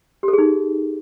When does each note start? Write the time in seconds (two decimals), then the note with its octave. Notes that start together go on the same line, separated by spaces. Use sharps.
0.23 G4
0.28 A4
0.33 G#4
0.38 D#4